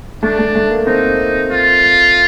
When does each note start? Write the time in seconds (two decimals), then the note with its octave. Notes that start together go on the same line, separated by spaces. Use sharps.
0.23 A3 D4
0.39 A3
0.55 A3
0.71 A#3
0.87 C4 D#4
1.51 F4